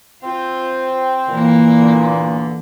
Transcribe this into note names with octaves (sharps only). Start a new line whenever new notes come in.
C4 F4
A#2 E3 A#3
E2 D3